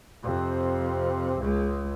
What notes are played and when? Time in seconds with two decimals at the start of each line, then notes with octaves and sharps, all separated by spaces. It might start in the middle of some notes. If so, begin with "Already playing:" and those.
0.23 F2 C3
1.40 C#2 G#3